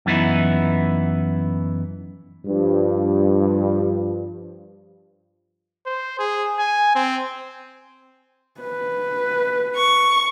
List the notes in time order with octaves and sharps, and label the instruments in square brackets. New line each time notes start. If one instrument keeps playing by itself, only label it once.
[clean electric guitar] F#2 E3 B3 D#4 E4
[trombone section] G2 F3
[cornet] C5
G#4
G#5
C4
[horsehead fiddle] B4
[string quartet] C#6